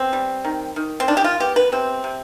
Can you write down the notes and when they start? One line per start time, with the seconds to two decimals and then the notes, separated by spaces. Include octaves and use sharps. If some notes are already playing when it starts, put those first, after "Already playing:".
Already playing: B3 C4
0.13 G3
0.45 D#3
0.76 D#3
1.00 C4
1.08 D#3 D4
1.17 G4
1.24 F4
1.40 B3 G4
1.56 B4
1.72 C3 C4
2.04 C3